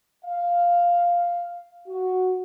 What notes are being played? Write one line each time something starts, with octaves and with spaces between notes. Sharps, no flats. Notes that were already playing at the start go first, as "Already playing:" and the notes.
F5
F#4